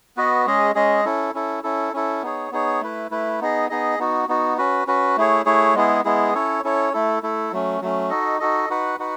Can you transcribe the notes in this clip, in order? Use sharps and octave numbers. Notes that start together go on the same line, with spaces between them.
B3 F#4 B4 D#5
G#3 C#4 G#4 D#5
G#3 C#4 G#4 D#5
C#4 E4 A4
C#4 E4 A4
C#4 E4 A4
C#4 E4 A4
B3 D#4 G#4 C#5
B3 D#4 G#4 C#5
A3 E4 B4
A3 E4 B4
B3 D#4 G#4 D#5
B3 D#4 G#4 D#5
B3 D#4 F#4
B3 D#4 F#4
C#4 F#4 B4
C#4 F#4 B4
A3 E4 G#4 C#5
A3 E4 G#4 C#5
G#3 B3 E4 G#4
G#3 B3 E4 G#4
C#4 E4 A4 C#5
C#4 E4 A4 C#5
A3 E4 A4
A3 E4 A4
F#3 A3 C#4
F#3 A3 C#4
D#4 F#4 A4 D#5
D#4 F#4 A4 D#5
D#4 F#4 B4 F#5
D#4 F#4 B4 F#5